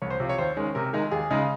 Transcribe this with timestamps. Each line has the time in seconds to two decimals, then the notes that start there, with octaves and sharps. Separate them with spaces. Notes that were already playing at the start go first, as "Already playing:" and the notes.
0.02 C2 C#5
0.10 C5
0.20 C3 F3
0.29 C#5
0.38 D#2 C5
0.57 D#3 G#3 C#4
0.75 C3 A#4
0.93 D#3 G#3 D#4
1.11 D#2 G#4
1.30 C#3 G#3 D#4